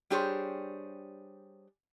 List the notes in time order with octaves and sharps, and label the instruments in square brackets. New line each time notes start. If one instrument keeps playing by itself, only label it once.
[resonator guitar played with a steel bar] G3 D4 G4 G#4 C5 C#5